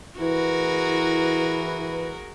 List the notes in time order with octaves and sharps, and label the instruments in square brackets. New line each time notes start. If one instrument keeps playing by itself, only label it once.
[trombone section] E3 B4 [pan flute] E4 [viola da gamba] F#4 G#4 A#4